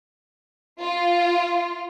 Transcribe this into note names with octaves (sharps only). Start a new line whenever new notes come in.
F4